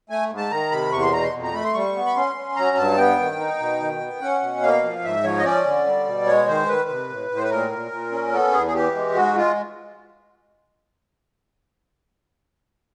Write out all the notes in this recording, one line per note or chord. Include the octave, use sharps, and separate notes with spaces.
A3 G#5
G#2
A5
D#3 A#5
C3 B5
E2 C#6
C6
B2 A#5
C6
F2
A#5
A3 B5
C6
G3 C#6
B3
B5
C#4 C6
C#4
F#3 A#5
G2 A5
B3 G5
D#3
D#4
B2
D#3
B3
C#4 F#5
B2
A#3 F5
F3
G#2 E5
F3 C#5
D#5
C#4 D5
D3
G3
B2
G#3 C#5
D#3 C5
D#3 B4
C3
A2
A2
C5
B4
A#2 A#4
A#2
A#2
C#4
B3 A4
E2 G#4
G#4
E3 G4
G#3
G#2 F#4
G#3 F4